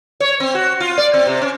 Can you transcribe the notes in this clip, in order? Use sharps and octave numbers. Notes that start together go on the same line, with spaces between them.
C#5
C4
F#4
F4
D5
C4
C3
C#4